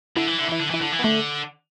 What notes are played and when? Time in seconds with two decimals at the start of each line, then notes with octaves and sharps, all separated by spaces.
0.16 D3 E4
0.27 E3
0.38 D3
0.49 E3 E4
0.60 D3
0.71 E3 E4
0.81 D3
0.92 E3
0.99 B3
1.03 D3 A3